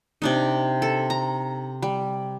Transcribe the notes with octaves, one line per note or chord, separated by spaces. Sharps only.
C3 D4 D#4
A4
A#5
G3